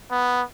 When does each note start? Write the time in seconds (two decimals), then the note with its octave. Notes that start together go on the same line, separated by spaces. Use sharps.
0.11 B3